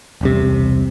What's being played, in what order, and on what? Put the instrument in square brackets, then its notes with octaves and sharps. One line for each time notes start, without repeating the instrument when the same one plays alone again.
[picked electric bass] E1 C2 C3